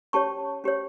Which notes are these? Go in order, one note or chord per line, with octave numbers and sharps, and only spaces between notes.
C#4 G4 C#5 A5 C#6
C#4 G4 C#5